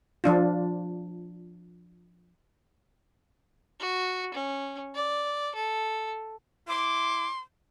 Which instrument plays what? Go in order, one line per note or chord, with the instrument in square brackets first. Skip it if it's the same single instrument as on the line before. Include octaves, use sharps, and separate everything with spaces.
[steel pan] F3 D4 F4
[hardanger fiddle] F#4
C#4
D5
A4
[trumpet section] E4 D6 [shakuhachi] C6